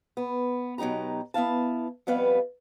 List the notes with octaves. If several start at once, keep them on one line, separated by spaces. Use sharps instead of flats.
B3
B2 F#3 D#4 G4 A#5
B3 E4 F5 A5
F2 G3 B3 B4 F5